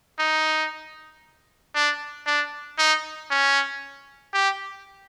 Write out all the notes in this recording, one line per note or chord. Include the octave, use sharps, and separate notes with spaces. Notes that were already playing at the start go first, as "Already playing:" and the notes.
D#4
D4
D4
D#4
C#4
G4